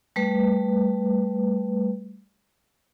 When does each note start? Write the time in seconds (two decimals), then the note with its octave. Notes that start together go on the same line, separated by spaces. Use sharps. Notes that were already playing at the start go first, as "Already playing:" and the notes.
0.16 G3 A3 B4